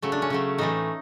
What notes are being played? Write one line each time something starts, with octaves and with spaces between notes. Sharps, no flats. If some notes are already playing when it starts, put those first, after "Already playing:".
C#3 F#3 A3
D4
C#4
C#3 F#3 A3
A2 E3 A3 D#4